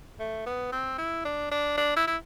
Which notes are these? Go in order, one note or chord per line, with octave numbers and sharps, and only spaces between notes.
A3
B3
C4
E4
D4
D4
D4
E4
E4